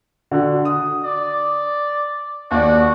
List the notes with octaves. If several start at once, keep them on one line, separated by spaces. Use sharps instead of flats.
D3 F#4
D#6
D5
D#2 F#4 D5